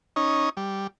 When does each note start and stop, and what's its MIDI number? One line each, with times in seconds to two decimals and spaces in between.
0.16 0.49 61
0.16 0.49 63
0.57 0.87 55